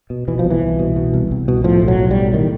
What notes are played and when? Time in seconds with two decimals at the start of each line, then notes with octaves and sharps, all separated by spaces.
0.10 B2
0.28 B2 E3
0.39 F3
0.45 C2
0.50 E3
0.61 C2
0.79 B2
0.96 B2
1.13 C2
1.31 C2
1.48 B2
1.64 A2 F3
1.82 B1
1.88 F#3
1.99 B1
2.11 G3
2.16 A2
2.34 A2 D#3